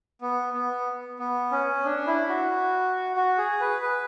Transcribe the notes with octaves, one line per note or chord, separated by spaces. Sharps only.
B3
B3
B3
C#4
D4
E4
F#4
F#4
G#4
B4
B4